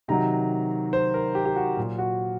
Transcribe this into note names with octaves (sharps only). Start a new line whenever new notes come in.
C3 D#3 F#3 A#5
C5
A#4
G4
G4
F#4
A#2 F#3
F#4